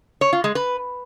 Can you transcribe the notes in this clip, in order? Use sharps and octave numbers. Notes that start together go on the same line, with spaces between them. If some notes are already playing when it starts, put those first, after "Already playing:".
C#5
F4
G#3
B4